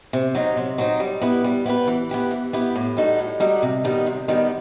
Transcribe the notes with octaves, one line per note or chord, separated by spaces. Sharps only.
C3
F#3 C4 D#4
C3
F#3 C4 D#4
G3
B3 E4 G4 B4
G3
B3 E4 G4 B4
E3
B3 E4 G4 B4
E3
B3 E4 G4 B4
A2
G3 D#4 F#4 A4
A2
G3 D#4 F#4 A4
C3
D#3 G3 B3 D#4
C3
D#3 G3 B3 D#4